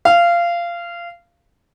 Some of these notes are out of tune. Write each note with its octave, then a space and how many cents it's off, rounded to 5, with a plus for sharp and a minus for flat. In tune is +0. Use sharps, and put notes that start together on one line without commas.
F5 -20